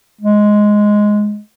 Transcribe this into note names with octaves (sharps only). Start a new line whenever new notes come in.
G#3